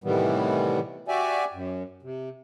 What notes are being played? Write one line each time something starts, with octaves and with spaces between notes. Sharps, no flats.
A2 C3 D#3 E3 G3 B3
F#4 G4 D5 E5 G#5
F#2
C3